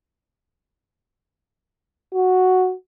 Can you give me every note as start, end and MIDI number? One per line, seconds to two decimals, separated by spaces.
2.14 2.73 66